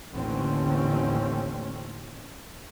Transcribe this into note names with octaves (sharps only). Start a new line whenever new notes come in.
A1 D#2 D3 A3 C4 C#4